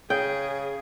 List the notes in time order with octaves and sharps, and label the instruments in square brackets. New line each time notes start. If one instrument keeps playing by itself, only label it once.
[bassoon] C#3 [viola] G#4 [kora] G5